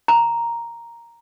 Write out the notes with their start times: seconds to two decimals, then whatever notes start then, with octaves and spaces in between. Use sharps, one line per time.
0.08 A#5